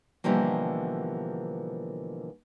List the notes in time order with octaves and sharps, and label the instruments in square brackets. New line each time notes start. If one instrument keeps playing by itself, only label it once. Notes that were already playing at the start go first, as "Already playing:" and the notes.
[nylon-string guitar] B2 D3 E3 F3 G3 A#3